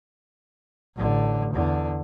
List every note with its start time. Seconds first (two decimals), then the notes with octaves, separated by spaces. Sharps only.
0.97 A1 D3
1.54 E2 D3